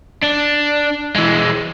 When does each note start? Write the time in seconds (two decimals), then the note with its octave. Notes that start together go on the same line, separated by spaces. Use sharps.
0.22 D4
1.16 E3 G#3